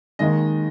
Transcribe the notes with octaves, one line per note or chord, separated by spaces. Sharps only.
D#2 D#3 G#3 D#5